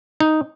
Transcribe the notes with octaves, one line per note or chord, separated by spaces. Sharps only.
D#4